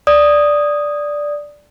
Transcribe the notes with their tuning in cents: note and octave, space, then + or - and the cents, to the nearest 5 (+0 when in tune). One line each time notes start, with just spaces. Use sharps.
D5 +0 D#6 +0